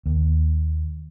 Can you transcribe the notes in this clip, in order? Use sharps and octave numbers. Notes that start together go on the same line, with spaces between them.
D#2